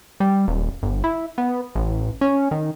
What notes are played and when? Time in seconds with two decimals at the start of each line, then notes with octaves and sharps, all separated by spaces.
0.20 G3
0.48 D#1
0.82 G1
1.04 E4
1.38 B3
1.75 A1
2.21 C#4
2.51 D#3